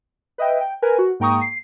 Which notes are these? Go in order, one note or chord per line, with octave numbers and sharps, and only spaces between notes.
B4 D#5 E5 G5
G5
A#4 B4 G#5
F#4
G#2 A#3 G5 A#5 C#6 D#6
C7